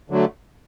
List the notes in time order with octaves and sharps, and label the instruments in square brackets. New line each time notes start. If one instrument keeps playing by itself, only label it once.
[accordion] D3 F#3 A3